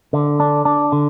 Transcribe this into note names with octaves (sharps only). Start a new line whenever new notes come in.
D3
D4
D4
D3